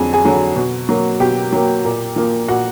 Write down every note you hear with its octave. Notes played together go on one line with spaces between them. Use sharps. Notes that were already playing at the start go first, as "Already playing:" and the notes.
Already playing: F2 D3 F#3 G#4 G#5
G#4 G#5
D3 F#3
B2
F#3 A#3
B2 G4 G5
F#3 A#3
A#2
F3 A#3
A#2 F#4 F#5